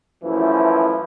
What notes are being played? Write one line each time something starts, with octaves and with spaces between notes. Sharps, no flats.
F#2 E3 F3 A3 E4